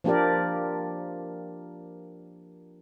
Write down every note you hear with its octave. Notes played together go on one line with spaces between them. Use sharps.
F3 A#3 D4 G4 A#4 D5